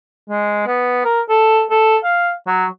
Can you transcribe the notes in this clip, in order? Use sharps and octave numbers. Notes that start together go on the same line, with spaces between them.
G#3
B3
A#4
A4
A4
F5
F#3